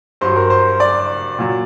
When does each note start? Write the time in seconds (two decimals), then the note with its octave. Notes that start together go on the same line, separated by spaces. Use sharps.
0.21 G2 F#3 C5
0.36 A#4
0.50 C5
0.80 D5
1.39 A#2 F#3